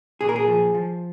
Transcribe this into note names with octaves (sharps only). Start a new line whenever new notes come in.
A#2 G#4
A#4
G#4
F3
F3